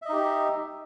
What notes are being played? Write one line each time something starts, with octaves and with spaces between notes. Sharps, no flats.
D#4 G4 D#5 E5